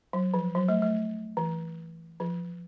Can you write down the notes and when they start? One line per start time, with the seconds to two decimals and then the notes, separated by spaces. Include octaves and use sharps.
0.13 F#3
0.34 F3
0.55 F#3
0.69 A3
0.82 A3
1.37 E3
2.20 F3